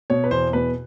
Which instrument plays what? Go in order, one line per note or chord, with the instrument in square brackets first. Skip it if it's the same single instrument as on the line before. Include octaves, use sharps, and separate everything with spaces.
[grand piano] B2 C#5
B4
E2 C5
B2 B4